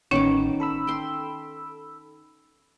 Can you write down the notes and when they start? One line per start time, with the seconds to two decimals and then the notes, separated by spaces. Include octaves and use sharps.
0.11 A1 D#3 B3 C#4 C#5 D6
0.60 A4 B5 E6
0.87 G5 C6